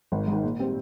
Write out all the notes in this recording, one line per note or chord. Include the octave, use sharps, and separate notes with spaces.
G#1
G#2
D#3
A#2
G3 C4